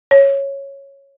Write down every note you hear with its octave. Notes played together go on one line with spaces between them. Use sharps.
C#5